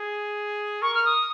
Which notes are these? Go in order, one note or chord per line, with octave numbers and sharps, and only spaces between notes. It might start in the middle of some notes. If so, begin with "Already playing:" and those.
Already playing: G#4
A#4 C#6
F6
D#6